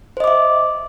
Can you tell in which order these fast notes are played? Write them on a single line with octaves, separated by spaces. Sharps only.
C5 D#5 D6 E5